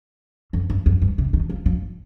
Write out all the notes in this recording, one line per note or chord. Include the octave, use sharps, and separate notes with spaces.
F2
G2
F2
G2
C3
D#3
F3
F3